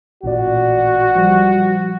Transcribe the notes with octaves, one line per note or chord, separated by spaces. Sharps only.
A1 A#2 F#4 D5
F3 G3